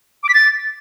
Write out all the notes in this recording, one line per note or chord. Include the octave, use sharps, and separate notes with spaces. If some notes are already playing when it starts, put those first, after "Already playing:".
D6
B6
A6